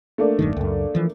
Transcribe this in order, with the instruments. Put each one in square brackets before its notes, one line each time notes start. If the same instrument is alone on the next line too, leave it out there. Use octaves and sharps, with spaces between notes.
[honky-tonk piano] A3 A#3 D4
[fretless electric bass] E1 G2 D#3
C#2 F#2
E3 F3